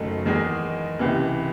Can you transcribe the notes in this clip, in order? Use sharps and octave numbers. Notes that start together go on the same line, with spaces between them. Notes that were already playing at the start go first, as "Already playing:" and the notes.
Already playing: F#1 F#2 D#3 A3 D#4
E2 D#3 G#3 D#4 G#4
C#2 C3 E3